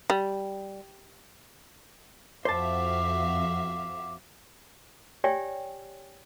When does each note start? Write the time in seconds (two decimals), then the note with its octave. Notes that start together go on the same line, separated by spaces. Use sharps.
0.10 G3
2.45 F2 F#4 C5 E5 F5 A5 D6
5.24 G4 C#5 D5 E5 G5 G#5